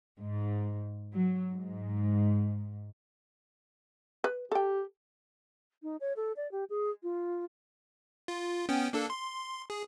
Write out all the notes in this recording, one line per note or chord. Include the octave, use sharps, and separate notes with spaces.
G#2
F#3
G#2
B4
G4 A4 G5
D#4
C#5
A4
D5
G4
G#4
F4
F4
B3 C#4 G5
A#3 D4 A4
C6
G#4